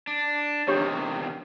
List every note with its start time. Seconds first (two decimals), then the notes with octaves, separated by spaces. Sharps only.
0.07 D4
0.68 E2 C3 D#3 D4 G4 C#5